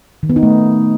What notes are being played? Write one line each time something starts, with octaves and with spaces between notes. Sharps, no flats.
D#3
B3
D#4
A3